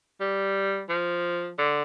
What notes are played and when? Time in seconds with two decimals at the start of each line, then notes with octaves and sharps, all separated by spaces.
0.20 G3
0.89 F3
1.59 D3